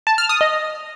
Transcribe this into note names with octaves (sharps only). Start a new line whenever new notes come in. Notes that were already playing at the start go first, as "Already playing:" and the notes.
A5
F6
D#6
D#5